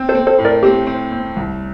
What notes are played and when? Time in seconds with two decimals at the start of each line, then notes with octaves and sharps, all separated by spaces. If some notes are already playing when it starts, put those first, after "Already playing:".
Already playing: C4
0.09 A4 C5
0.15 C4
0.27 A4 C5
0.38 A2
0.45 A#4 D5
0.63 C4 G4
0.87 C4
1.12 C4
1.36 C2